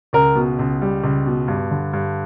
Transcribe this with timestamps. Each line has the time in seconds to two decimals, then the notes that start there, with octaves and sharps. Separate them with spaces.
0.13 C#2 A#4
0.36 B2
0.59 C#2
0.82 G3
1.03 C#2
1.26 B2
1.48 G2
1.71 D3
1.93 G2